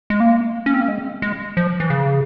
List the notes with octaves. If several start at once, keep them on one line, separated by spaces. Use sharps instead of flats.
G#3
A#3
C#4
C4
A#3
G#3
G#3
F3
E3
C#3